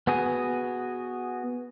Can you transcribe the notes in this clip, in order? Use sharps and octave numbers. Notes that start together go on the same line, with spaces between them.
B3 F#4 G#4